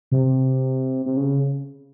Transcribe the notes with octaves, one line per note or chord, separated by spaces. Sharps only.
C3
C3
C#3